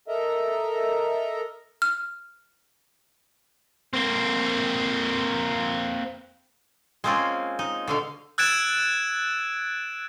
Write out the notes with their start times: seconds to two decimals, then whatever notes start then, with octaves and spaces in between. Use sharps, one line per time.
0.08 A4 A#4 D#5 E5 A#5
1.82 F6
3.93 A#3 C4
7.04 G#3 A#3 C4 C#4 F4
7.59 D#4
7.88 B2 D3 F5
8.38 E6 F#6 G#6 A6 D7 E7